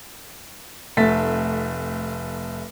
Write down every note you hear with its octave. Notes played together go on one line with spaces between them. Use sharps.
F1 A3 E5 A6 B6